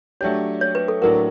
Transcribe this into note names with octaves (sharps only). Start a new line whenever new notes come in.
F#3 A3 D4 G4 C#5
C#5
B4
A4
A2 F#3 A#3 D4 F#4 A#4